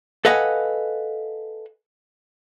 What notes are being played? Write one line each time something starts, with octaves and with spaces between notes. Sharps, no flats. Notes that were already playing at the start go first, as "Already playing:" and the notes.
A4 B4 D#5 F5 F#5 G#5